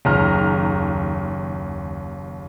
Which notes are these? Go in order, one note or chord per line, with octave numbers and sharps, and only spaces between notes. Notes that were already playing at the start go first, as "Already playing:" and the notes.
F#1 D#2 A#5 F6